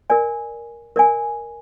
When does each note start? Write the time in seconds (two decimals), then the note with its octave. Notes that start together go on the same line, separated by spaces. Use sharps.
0.10 A#4 D5 G#5
0.96 A#4 D5 G#5